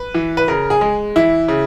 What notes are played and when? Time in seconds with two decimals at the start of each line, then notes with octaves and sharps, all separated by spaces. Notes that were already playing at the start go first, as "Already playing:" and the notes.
Already playing: B4
0.15 E3
0.37 B4
0.48 C#3 A#4
0.70 G#4
0.81 G#3
1.16 E3 E4
1.48 C#3